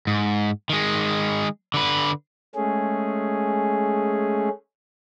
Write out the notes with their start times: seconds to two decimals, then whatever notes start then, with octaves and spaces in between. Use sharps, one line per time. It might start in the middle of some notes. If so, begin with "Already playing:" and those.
0.07 G#2
0.70 D#3 G#3
1.74 D3 B4
2.55 G#3 A3 C#4 G#4